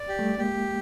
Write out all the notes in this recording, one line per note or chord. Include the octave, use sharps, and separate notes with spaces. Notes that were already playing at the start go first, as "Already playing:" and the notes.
Already playing: D5
G4
G3 A3
G#3 A#3 G4